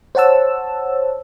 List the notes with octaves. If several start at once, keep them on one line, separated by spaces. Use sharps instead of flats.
C5 C#5 F#5 A5 E6